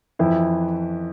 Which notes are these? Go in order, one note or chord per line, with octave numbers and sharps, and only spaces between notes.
F2 E3 E4